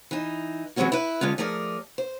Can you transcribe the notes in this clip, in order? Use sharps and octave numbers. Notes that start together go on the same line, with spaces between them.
E3 D#4
E3 F#3 G#3 C4 C#4 F#4
E4 B4
D3 G#3 C#4 F4
F3 A3 G#4 A#4 D5
C5